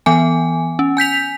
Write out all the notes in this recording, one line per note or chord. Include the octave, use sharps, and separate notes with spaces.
E3 B3 G#5
C#4
G#5 G6 B6 F7